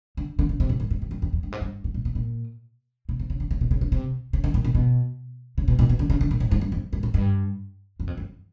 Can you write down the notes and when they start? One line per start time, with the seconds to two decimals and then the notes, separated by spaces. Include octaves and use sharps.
0.17 D3
0.39 D3
0.49 C#3
0.60 C3
0.69 A2
0.80 G#2
0.91 G#2
1.02 G2
1.11 F#2
1.22 F2
1.33 F2
1.43 G2
1.52 G#2
1.61 G2
1.84 G#2
1.94 A#2
2.05 B2
2.15 A#2
3.09 B2
3.19 C3
3.30 C#3
3.40 D3
3.51 C#3
3.61 B2
3.71 C#3
3.81 C#3
3.92 C3
4.33 C#3
4.44 D3
4.54 A#2
4.64 A#2
4.75 B2
5.58 C#3
5.68 B2
5.79 A#2
5.89 B2
5.99 D3
6.10 C#3
6.21 D3
6.31 A#2
6.40 A2
6.51 G#2
6.61 G2
6.72 F2
6.93 G2
7.03 A2
7.14 G2
8.00 F#2
8.07 F2
8.18 F#2